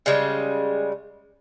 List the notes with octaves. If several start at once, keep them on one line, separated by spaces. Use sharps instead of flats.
C#3 G3 G#3